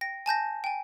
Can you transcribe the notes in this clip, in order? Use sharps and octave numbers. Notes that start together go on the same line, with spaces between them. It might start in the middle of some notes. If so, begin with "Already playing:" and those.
G5 A#6
G#5 A5 G6 A#6
G5 G#5